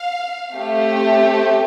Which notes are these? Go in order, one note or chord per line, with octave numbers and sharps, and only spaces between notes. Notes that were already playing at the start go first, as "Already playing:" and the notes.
Already playing: F5
A3 C4 G4